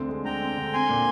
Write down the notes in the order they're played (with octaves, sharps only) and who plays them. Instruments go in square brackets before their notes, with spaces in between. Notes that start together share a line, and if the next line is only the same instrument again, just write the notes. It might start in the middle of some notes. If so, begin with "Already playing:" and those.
Already playing: [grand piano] D2 D3 C4
G#3
[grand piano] D3 [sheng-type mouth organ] G5 A#5
[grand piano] C4
D3
[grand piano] C4 [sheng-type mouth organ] G#5 C6
[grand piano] A#2